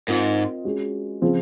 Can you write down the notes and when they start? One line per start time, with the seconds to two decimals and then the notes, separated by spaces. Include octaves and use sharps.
0.07 G#2 C4 F4 A#4 D#5
0.65 G#3 C#4 F#4
1.22 C#3 F3 C4 F4